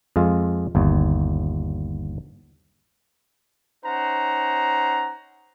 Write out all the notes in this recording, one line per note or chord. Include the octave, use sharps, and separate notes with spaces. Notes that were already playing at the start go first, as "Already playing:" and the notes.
F2 G#3 F4
G1 D#2
C#4 D#4 C5 F#5 A#5